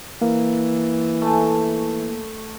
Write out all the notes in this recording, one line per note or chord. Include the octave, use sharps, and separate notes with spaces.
E3 A#3
A3 G#5 A5